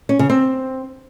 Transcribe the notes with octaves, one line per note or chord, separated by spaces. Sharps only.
C#4
C#3
C4